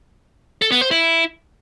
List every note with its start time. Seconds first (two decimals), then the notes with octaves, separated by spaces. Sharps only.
0.62 A4
0.72 B3
0.81 C5
0.91 E4